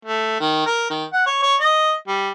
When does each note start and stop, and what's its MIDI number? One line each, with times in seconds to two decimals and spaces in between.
0.05 0.36 57
0.40 0.64 51
0.67 0.86 70
0.90 1.04 51
1.13 1.25 78
1.27 1.41 73
1.43 1.55 73
1.61 1.94 75
2.08 2.31 55